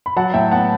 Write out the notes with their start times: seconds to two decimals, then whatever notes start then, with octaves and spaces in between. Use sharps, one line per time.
0.06 B5
0.16 F#3 F#5 A5
0.34 A2 E5 G5
0.52 B3 F#5 A5